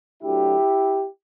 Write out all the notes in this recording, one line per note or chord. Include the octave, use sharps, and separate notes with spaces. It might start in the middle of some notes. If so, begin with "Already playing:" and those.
D2 D3 F#3 E4 G4